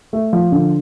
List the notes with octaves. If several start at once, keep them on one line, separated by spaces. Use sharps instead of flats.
A3
F3
D3